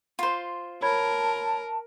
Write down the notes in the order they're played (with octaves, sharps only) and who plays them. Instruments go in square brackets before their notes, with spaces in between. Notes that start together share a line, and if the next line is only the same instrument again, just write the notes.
[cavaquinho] F4 C5
[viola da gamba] A#4 [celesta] C#5 B5 G#6 [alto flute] A5